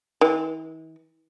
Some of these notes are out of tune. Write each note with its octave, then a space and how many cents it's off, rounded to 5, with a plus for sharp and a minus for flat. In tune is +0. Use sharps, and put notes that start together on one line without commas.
E3 -45